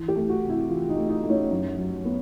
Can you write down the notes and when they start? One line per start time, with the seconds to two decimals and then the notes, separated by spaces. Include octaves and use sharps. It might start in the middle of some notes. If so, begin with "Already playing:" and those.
Already playing: E3
0.08 G4
0.16 A3
0.29 F#4
0.43 C3
0.49 E4
0.69 E3 F4
0.89 D#4
0.96 A3
1.09 D#4
1.23 A3
1.30 C#4
1.51 F#2
1.78 F#3
2.05 B3